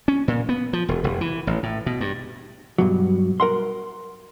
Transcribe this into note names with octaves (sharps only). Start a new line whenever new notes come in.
C#4
A#2
B3
F3
E1
F1
E3
A1
A2
B2
G2
G2 B2 F#3
A#4 F#5 C6